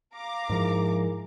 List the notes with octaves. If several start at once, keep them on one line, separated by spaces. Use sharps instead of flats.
F5 A#5 D6
G#2 F3 E4 G#4 A#4